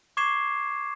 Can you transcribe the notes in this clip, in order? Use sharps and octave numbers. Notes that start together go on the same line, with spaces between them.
C#6 D6 G#6 C7 E7